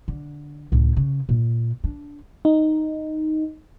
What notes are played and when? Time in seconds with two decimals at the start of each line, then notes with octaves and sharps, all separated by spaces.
0.08 D3
0.72 C#2 A2
0.96 C#3
1.29 A#2
1.84 D4
2.45 D#4